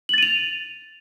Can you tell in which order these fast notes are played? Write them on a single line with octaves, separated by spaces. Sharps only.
F#7 A6 D#7 F7